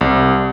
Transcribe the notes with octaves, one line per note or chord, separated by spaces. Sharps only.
C2